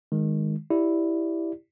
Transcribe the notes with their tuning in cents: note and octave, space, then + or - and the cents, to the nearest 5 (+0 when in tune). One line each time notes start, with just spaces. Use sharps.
D#3 +0 G#3 +0
E4 +0 G4 +0 D5 +0